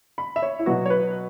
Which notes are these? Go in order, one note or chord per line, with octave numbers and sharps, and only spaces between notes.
B5
E5
C#5
E4
B2 F#3 B3 F#4
C#5
B4